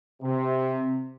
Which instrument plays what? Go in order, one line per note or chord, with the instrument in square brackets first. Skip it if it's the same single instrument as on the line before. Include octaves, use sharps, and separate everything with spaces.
[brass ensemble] C3